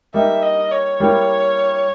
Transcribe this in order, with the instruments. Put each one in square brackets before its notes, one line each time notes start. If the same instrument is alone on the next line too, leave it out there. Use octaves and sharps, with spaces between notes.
[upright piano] G3 A#3 D#4 [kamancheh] E5
[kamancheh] D#5
C#5
[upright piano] G3 A#3 E4